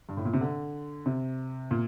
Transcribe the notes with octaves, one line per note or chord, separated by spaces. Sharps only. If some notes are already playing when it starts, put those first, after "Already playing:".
G2
A2
A#2
C3
D3
C3
A#2